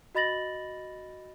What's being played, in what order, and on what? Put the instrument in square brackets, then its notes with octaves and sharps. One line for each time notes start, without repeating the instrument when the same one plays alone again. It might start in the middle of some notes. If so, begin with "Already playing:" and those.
[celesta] F#4 D#5 B5 A6 A#6 F#7